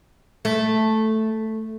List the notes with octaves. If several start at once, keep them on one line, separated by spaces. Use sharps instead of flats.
A3